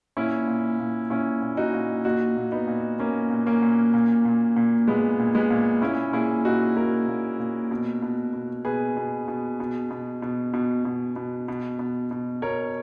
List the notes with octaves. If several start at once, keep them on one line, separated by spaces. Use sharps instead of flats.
A#2 C#4 E4
A#2
A#2
A#2 C#4 E4
A#2
D#4 F#4
A#2
A#2 D#4 F#4
A#2
B3 D#4
A#2
A#2 A#3 C#4
A#2
A#3 C#4
A#2
A#2
A#2
A#2
A#2 G#3 B3
A#2
G#3 B3
A#2
A#2 C#4 E4
A#2 E4 G#4
A#2 D#4 F#4
A#2 F#4 A#4
A#2
A#2
B2
B2
B2
B2 G#4 B4
B2
B2
B2
B2
B2
B2
B2
B2
B2
B2
B2
B2 A#4 C#5